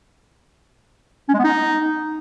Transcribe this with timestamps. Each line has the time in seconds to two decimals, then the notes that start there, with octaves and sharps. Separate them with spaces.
1.29 C#4
1.34 G#3
1.39 B3
1.44 D#4